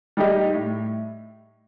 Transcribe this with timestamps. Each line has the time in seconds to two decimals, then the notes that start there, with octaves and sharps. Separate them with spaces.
0.17 G3 D#4 G4 D#5
0.53 A2